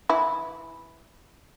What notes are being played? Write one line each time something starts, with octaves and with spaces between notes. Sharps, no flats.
E3 E4